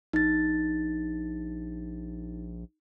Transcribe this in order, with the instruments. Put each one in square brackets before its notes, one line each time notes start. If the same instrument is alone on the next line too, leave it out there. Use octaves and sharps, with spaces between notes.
[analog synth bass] A#1 [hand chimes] D#4 A6